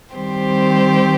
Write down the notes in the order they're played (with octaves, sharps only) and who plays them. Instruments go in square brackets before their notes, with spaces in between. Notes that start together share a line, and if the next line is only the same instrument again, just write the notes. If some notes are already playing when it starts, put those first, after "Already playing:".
[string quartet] D#3 G3 C4 G4 C5